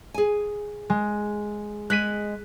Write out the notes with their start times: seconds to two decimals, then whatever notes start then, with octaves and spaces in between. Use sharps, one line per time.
0.14 G#4 G#5
0.90 G#3
1.90 G#3 F#6 B6 D#7